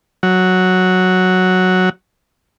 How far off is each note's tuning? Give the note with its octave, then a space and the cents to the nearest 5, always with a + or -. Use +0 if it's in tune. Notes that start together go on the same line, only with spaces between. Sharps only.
F#3 -5